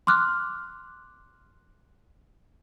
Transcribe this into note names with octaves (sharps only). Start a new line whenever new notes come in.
C6 D6 F6 F#6